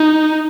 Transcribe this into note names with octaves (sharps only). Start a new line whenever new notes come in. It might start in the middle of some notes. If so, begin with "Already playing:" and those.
Already playing: D#4